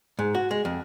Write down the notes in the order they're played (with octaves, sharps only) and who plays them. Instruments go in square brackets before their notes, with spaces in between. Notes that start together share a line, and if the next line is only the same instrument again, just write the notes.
[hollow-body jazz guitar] G#2
F#4
G#3
F2